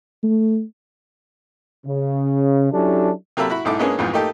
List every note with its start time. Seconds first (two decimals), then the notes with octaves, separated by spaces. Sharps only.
0.23 A3
1.87 C#3
2.72 F#3 C#4 D4 E4 G4 A4
3.37 C3 F#3 A#3 A4 E5 B5
3.50 E4 F#4 B5
3.65 B1 G#2 D#4 E4 A4 D6
3.79 G#3 A#3 B3 C#4 D4 G#4
3.98 B1 F2 G#2 E3
4.13 A3 A#3 D#4 G4 A4